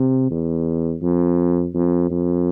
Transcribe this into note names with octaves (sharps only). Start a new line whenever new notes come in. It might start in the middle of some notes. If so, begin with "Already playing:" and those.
Already playing: C3
E2
F2
F2
F2